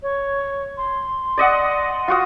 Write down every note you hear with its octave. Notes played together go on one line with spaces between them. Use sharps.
C#5
C6
D5 D#5 F#5
C6
F4 F#4 D#6